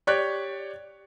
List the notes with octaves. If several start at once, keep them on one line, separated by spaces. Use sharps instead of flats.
G4 C#5 D5 F#6